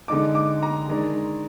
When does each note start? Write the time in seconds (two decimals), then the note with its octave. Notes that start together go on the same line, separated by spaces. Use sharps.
0.08 D3 G#3 D#4 D6
0.35 D6
0.63 A#5
0.88 D#3 G#3 D4